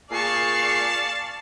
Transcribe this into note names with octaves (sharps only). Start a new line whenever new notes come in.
A#2 G#4 D5 F5 G#5 A5 C#6 C7